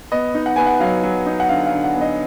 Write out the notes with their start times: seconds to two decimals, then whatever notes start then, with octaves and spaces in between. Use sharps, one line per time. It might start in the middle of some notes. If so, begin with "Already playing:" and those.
0.12 B3 D#5
0.35 D#4
0.46 F#5
0.56 B3 G#5
0.67 F#5
0.80 F#3 F5
1.03 F#3
1.26 D#4
1.40 F#5
1.49 D3 F5
1.67 F5
1.72 D3
1.84 F#5
1.95 B3
2.01 D#5